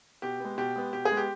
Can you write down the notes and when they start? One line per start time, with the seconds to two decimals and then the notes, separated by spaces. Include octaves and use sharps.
0.22 B2 G4
0.40 G#3 B3
0.58 B2 G4
0.76 G#3 B3
0.93 B2 G4
1.05 G#4
1.11 G#3 B3
1.17 G4